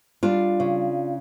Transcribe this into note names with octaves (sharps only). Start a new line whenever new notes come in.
G3 D4 F4
C#3